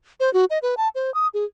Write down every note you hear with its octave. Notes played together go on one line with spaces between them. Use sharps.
C5
F#4
D#5
B4
A5
C5
D#6
G#4